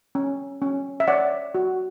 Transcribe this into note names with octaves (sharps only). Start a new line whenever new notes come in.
C#4
C#4
E5
C#5 D5 F#5
F#4